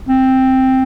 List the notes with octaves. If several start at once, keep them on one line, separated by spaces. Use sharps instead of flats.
C4